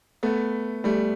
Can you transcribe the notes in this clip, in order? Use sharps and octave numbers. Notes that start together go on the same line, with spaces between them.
A3 B3
G3 A3